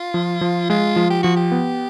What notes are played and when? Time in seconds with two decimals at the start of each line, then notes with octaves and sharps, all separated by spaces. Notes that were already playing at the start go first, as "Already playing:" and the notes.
Already playing: F4
0.14 F3
0.41 F3
0.70 G#3 F4
0.96 F3
1.10 G4
1.23 F3 F#4
1.36 G4
1.52 B3